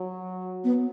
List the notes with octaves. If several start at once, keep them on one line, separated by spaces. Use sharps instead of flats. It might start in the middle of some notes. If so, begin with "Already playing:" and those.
Already playing: F#3
B3